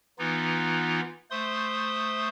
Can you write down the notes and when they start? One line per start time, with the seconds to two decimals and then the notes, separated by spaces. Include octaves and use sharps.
0.19 E3 B3 D#4 F4
1.31 A3 C5 C6 D#6